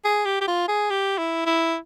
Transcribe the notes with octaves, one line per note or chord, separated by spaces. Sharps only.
G#4
G4
G4
F4
G#4
G4
E4
E4